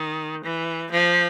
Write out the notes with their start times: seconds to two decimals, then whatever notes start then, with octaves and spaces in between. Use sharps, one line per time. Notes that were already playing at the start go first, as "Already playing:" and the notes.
Already playing: D#3
0.45 E3
0.91 F3